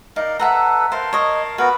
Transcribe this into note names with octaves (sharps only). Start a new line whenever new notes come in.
D#4 A#4 D5 F5
A4 B4 E5 F#5 A#5
A#4 C5 F5 A5
C#5 D#5
B3 F#4 A#4 B4